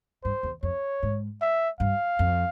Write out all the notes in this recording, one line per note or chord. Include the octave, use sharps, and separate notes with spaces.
G2 C5
E2
F2 C#5
G#2
E5
G2 F5
F2